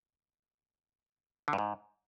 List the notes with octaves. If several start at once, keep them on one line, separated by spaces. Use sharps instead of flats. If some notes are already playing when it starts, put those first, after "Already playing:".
D3
G2
G#2